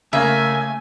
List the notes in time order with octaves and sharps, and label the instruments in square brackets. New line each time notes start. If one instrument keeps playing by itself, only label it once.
[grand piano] C#3 A#3 [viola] A3 G#5 [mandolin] E5